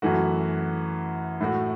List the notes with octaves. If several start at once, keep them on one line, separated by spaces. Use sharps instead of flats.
F#2 E3 A3 F#4
A2 A3 F#4